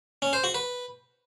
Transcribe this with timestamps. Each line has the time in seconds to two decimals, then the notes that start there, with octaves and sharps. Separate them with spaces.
0.22 C#4
0.33 C5
0.44 F#4
0.54 B4